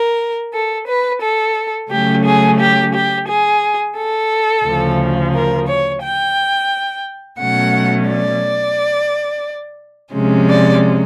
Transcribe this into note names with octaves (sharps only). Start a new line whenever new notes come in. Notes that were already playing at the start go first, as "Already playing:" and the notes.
Already playing: A#4
A4
B4
A4
C#3 F#3 A3 C#4 G4
G#4
G4
G4
G#4
A4
D2 C#3 F3
A#4
C#5
G5
B2 F#3 A3 C#4 F#5
D5
C3 F3 G#3 C#4
D5